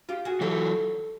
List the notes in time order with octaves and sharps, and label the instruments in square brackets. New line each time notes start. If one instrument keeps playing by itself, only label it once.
[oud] F4 G4
F#4 G#4
[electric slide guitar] E3 F#3 [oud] G4 A4